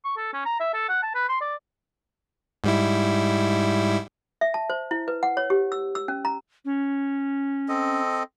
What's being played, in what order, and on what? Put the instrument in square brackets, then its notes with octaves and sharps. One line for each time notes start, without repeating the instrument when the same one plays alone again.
[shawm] C#6
A4
C#4
A#5
E5
A4
F#5
A5
B4
C6
D5
[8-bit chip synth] G#2 G3 E4
[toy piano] E5
A5
C5
E4
B4
F#5
C#5
G4
E6
E6
C#4
A#5
[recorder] C#4
[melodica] C4 A4 D#5